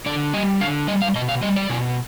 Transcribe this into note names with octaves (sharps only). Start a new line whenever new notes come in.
D3 D5
G3 D#5
D3 F5
G3 D#5
F5
B2 D#5
F5
G3 D#5
D5
B2